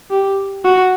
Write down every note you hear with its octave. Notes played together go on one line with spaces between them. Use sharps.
G4
F#4